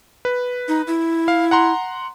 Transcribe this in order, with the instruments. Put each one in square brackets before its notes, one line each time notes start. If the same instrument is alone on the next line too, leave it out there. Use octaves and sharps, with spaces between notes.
[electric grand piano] B4
[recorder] D#4
E4
[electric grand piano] F5
F#5 A#5 C6